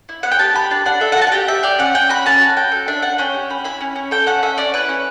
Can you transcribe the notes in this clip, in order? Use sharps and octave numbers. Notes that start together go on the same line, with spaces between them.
E4
B3 F#5
G5
G4 A5
G4 B5
D4 A5
D4 F#5
A4 E5
F#5
F#4 A5
F#5
G4 G5
G4 E5
G4 D5
C#4 F#5
C#4 G5
F#4 B5
C#4 A5
F#4
F#4 G5
A4
D4 E5
D4 F#5
C#4 G5
G4
C#4 B5
E4 B5
C#4
C#4
A4 G5
C#4 F#5
C#4 E5
C#4 D5
E4 B4
C#4